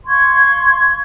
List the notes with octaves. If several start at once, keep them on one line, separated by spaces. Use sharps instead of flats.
F5 C6 C#6 G#6